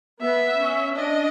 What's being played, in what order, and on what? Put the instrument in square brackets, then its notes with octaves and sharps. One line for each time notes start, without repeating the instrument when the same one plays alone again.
[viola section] B3 [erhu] E5
[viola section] C#4
[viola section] D4 [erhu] D#5